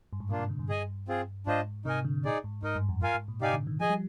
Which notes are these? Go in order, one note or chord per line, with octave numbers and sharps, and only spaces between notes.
G2
G#2
A#2 A#3 D4 F4
C3
D3
G2
G#4 D#5 G#5
C4 F4 G#4
G#2 D4 F4 C5 D#5
C3 D#4 A#4 D#5 G#5
D3
A#2 D#4 G#4 D5
G#2
G#2 D#4 A#4 D#5
G2
F2
G2 F4 A#4 F5 G#5
G#2
A#2
C3 D#4 G4 D5 F5 G#5
D3
D#3
F3 G#4 D#5 G#5
G3